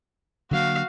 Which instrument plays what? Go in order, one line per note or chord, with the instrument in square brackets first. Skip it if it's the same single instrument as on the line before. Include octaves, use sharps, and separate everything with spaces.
[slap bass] D3 F#3 A#3 [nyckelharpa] F#4 F5